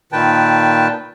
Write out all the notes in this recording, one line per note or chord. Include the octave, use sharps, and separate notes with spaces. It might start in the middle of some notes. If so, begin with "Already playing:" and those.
A#2 D#3 B4 G5 A5